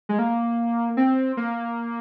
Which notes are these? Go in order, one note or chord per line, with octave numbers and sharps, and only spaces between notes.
G#3
A#3
C4
A#3